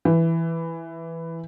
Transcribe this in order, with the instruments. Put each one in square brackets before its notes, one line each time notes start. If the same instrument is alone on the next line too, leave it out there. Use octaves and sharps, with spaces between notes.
[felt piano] E3